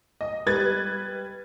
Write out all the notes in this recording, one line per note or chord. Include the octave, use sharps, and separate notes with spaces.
D#5
G3 B4 G#6 A6